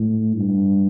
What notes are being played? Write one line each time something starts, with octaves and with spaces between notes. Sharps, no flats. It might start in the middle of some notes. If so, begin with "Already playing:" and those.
Already playing: A2
G2